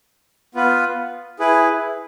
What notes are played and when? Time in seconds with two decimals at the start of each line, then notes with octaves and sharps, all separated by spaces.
0.55 B3 F4 B4
1.39 E4 G#4 B4